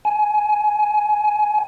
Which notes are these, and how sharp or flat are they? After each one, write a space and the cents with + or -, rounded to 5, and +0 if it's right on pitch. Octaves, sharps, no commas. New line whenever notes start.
G#5 +20